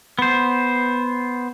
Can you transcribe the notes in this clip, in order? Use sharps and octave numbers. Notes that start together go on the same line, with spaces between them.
B3 C5